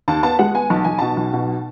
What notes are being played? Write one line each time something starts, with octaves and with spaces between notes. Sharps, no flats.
D#2 A5
B3 A5
G#3 F#5
B3 G#5
B1 A5
B1 G#5
B2 A5
B1
B2